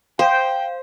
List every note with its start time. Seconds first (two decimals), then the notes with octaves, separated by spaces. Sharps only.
0.19 C5 F5 G5